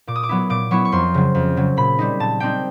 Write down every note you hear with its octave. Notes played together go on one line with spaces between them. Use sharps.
A#2 D6
D#6
D6
F#3 B3 E4
A#2 D6
F#3 B3 E4 C#6
C#6
F2 C6
C#3 F#3
F2
C#3 F#3
A#2 B5
G3 C4 D#4
A#2 A5
G3 C4 D#4 G5